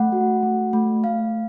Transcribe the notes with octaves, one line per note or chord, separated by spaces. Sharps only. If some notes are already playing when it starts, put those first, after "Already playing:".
Already playing: A3 F#5
F#4
A3
A3
A3 F5